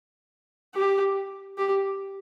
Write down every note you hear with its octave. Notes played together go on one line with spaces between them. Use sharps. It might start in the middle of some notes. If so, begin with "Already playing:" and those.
G4
G4